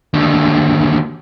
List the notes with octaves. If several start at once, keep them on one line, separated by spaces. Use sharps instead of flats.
D#2 D3